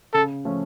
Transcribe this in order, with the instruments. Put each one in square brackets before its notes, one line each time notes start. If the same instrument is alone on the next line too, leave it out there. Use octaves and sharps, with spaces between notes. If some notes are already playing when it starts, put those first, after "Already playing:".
[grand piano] C#3 [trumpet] A4
[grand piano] F3 A3 C#4